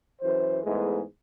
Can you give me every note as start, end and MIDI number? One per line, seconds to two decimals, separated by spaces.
0.22 0.58 42
0.22 0.58 52
0.22 0.58 72
0.64 1.01 40
0.64 1.01 44
0.64 1.01 56
0.64 1.01 57
0.64 1.01 59